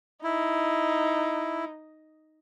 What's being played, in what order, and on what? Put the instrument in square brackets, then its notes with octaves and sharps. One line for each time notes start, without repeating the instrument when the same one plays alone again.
[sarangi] D#4 [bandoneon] E4